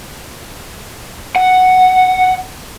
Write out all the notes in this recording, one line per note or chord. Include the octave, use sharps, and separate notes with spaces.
F#5